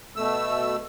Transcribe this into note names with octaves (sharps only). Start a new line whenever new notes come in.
B2 A3 E6